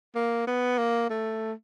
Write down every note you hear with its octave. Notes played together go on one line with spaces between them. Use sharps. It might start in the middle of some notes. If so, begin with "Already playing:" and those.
A#3
B3
A#3
A3